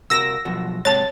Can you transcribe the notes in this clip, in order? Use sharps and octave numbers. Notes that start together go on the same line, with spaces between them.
C3 F#4 A#4 E6 A#6
B2 F3 F#3
G#2 C3 C#5 A5 A6